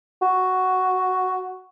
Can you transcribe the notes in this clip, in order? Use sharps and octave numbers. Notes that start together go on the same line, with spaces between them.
F#4